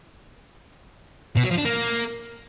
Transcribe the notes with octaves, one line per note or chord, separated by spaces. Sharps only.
B2
F#3
F3
D4
A#3